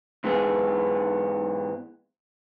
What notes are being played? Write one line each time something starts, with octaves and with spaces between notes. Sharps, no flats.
G#2 E3 B3 G#4